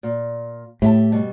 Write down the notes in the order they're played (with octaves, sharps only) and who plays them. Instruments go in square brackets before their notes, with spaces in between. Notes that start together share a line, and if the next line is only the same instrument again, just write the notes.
[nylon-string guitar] A#2
[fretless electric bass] A2 [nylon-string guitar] G4 E5 A5
[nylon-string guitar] B2 G3